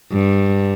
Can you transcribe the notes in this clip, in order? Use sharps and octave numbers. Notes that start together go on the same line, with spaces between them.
G2